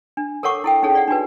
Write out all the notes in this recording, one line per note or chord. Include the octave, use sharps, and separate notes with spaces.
D4
A4 A#4 C#5 F#5 C#6 D6
E4 A4 G5
C#4 D#4 G#4 A4 C#5
D5 F#5
D4 D#4 F#4 B4